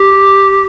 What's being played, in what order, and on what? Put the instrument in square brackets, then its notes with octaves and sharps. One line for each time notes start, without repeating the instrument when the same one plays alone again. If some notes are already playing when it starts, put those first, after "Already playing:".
Already playing: [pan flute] G4